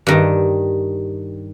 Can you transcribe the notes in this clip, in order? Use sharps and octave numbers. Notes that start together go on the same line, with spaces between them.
G2 D#3